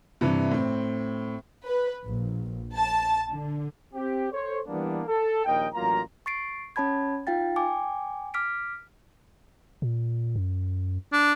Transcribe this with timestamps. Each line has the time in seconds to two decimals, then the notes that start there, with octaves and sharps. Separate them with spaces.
0.21 G2 C3 E3
0.52 A2 C4
1.65 B4
2.06 A#1
2.76 A5
3.29 D3
3.94 C4 G4
4.32 A4 C5 C#5
4.67 E3 G3 A#3 B3 D4
5.07 A4
5.45 A#1 D#2 A#4 D#5 G5
5.74 A1 F#3 A#3 F4 A#5
6.26 C#6 A6 C7 D7
6.76 C#4 C#5 A5 B5 G#6
7.27 D#4 F4 F5 G5 A6
7.56 G5 G#5 D6
8.34 D6 F6 B6 D7
9.82 A#2
10.36 F#2
11.13 D4